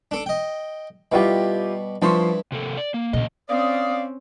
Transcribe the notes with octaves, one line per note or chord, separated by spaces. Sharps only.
D4 A4 D6
D#5 G5
B2 G3 E4 F4 G4
G2 F3 E4 C6 C#6
C3 A#3 A4
D5
A#3
E2 A#2 C#3 D#5
C4 C#4 D5 F5 D#6